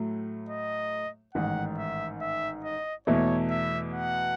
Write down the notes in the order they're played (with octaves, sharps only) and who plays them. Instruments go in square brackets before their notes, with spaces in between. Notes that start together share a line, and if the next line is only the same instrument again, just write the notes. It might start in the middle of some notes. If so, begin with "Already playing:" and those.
Already playing: [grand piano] A2 F#3 A3
[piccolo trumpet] D#5
[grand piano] A1 G#2 D#3 [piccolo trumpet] F#5
[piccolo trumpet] E5
E5
D#5
[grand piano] E2 B2 A3 E4 [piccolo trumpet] C#5
[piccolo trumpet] E5
F#5